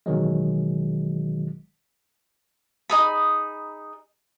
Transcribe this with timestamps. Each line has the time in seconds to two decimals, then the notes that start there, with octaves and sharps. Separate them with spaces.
0.06 A1 B2 D#3 F#3 G#3
2.90 D#4 G#4 B5